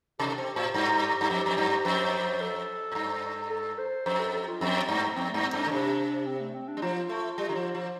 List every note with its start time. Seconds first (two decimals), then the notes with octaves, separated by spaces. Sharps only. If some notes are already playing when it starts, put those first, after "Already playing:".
0.20 C3 G4
0.38 C4
0.56 A2
0.74 G2
1.21 G2
1.30 F2
1.46 F2
1.57 G2
1.85 F2 C5
2.41 A4
2.92 A2
2.95 G2
3.50 A4
3.78 C5
4.06 F2 C5
4.20 A4
4.33 A4
4.48 F4
4.61 F2 C4
4.89 G2 A3
5.16 F2 C4
5.30 G2 A3
5.44 C4
5.53 G2 D4
5.66 D3
5.72 C3
6.26 C4
6.40 A3
6.54 C4
6.68 D4
6.77 G3
6.82 F3 F4
7.09 A3
7.38 G3
7.49 D3
7.56 F3
7.75 F3